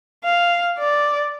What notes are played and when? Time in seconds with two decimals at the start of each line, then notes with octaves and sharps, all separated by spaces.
0.24 F5
0.79 D5